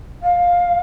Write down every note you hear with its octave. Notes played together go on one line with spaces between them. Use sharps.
F5